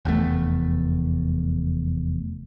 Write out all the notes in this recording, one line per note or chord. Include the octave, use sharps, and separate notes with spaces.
F1 E2 C3 A3